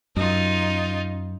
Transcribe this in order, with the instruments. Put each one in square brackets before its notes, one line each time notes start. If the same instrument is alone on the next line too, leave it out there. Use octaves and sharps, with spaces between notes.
[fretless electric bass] F#2 [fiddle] D#4 F4